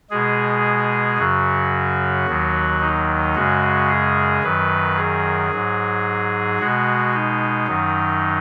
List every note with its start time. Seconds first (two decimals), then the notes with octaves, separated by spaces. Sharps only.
0.10 B2 G#3 G#4
1.18 F#2 C#3 F#3 F#4
2.27 D#2 D#3 F#3
2.81 D#4
3.35 F#2 C#3 G#3 F#4
3.88 G#4
4.43 F#2 D#3 F#3 B4
4.97 G#4
5.51 G#2 F#3
6.59 B2 G#3 F#4
7.14 D#4
7.67 F#2 D#3 F#3